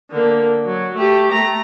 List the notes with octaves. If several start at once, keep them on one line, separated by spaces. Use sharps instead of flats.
D3 A#3
F#3
A3 G4
A3 A#5